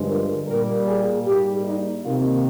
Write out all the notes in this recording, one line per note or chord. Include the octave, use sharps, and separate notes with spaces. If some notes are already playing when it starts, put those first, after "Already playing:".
Already playing: G2 D3 F3 G#3
A#4
A#2 G3 A#3 A#4
G#4
G#2 G3 A#3 G4
D#4
C3 D#3 A#3 F4